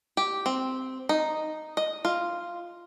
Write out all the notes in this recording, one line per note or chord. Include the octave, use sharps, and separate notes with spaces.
G4
C4
D#4
D#5
F4